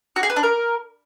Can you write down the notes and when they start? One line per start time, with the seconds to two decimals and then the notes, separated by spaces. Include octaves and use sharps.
0.16 F#4
0.23 G#4
0.30 B4
0.36 D4
0.43 A#4